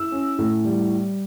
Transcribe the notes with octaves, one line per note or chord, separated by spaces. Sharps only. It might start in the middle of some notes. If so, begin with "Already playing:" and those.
Already playing: E4 E6
C#4
A2
G3